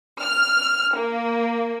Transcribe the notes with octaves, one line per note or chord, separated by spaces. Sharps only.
F6
A#3